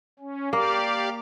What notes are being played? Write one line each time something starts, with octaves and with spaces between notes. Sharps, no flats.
C#4
A#3 G4 D5 F5